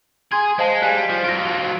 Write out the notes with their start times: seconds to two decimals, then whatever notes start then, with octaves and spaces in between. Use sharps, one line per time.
0.32 G#4 C6 G#6
0.59 G#3 C5 F5 A5
0.82 G3 F5 G#5 F#6
1.09 F3
1.24 F#3 F4 A#6 D7